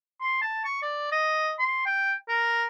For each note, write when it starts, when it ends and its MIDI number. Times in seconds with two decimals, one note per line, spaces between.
0.21 0.40 84
0.42 0.63 81
0.65 0.80 85
0.82 1.08 74
1.12 1.53 75
1.59 1.83 84
1.86 2.13 79
2.28 2.67 70